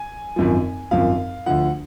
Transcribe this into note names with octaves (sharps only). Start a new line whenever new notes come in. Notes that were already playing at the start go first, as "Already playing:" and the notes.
Already playing: G#5
G#1 F#2 F3
G#1 F#2 F3 F5
D2 D3 F3 F#5